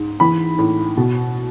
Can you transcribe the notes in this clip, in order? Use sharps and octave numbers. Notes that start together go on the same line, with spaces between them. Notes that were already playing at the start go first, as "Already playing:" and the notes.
Already playing: G#2
E3 B5
A2
B2